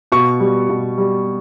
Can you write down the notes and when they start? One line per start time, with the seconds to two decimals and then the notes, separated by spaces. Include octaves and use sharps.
0.12 B2 C#6
0.40 G3
0.69 B2
0.98 G3